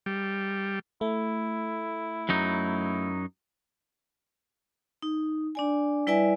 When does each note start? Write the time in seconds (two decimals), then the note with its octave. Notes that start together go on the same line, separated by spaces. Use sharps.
0.06 G3
1.01 A3 E4
2.29 F#2 F#3 D#4
5.02 D#4
5.55 D4 D5 G#5
6.07 G3 E4 B4 D5 E5 G#5